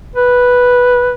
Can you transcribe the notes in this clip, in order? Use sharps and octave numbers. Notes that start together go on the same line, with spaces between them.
B4